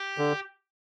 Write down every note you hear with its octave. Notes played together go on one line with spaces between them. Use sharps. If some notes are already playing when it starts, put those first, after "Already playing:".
Already playing: G4
D3